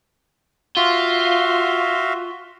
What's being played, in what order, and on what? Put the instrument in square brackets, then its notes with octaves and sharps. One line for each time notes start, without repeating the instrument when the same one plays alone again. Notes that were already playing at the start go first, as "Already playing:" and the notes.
[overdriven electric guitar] F4 [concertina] F#4 E5 F5